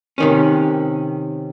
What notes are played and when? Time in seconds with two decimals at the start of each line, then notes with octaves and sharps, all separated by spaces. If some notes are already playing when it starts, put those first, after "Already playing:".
0.18 C3 D#3 C#4